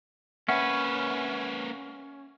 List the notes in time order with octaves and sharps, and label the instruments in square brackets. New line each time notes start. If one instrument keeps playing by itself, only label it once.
[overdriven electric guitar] A#3 B4 [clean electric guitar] C#4 [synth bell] E5 F#5